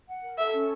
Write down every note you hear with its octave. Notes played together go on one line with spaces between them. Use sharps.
F#5
A#4
A4 E5
C#4